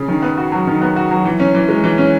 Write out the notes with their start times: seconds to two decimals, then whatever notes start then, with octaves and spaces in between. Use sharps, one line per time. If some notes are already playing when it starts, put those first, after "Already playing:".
Already playing: C#3
0.08 D#3
0.22 B3
0.38 F#4
0.52 F#3
0.67 D#3
0.82 B3
0.96 F#4
1.11 F#3
1.25 E3
1.40 C#4
1.55 E3
1.69 G#3
1.84 E3
1.98 C#4